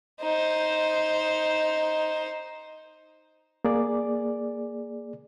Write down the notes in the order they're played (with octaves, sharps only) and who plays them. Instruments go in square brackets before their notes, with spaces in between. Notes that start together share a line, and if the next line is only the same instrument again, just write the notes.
[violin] D#4 C5
[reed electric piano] A#3 G#4 D5